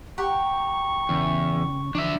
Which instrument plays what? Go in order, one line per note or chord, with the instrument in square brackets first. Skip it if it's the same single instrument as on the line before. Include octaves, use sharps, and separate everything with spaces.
[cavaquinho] G4 F#5 G5 [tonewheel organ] A#5 [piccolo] C#6
[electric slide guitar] E2 [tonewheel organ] C#3 C#4
[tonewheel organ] D3 E3 F3 [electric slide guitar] D4 E5